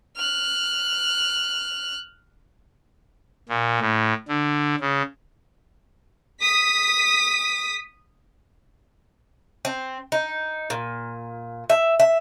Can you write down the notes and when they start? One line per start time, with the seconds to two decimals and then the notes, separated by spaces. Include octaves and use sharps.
0.17 F6 F#6
3.49 A#2
3.80 A2
4.28 D3
4.80 C#3
6.41 D#6 B6
9.65 C4
10.12 D#4
10.70 A#2
11.70 E5
12.00 E5